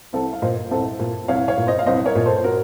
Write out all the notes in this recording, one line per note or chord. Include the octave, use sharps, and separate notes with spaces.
C2 A4 C5
F5
A#2 C5 D#5
C2 A4 C5
A#2
C2 C#5 F5
C#5 F5
A#2
C5 D#5
F5
C2 C5 D#5
A#4 C#5
A#2
A4 C5
C5
F#4 A#4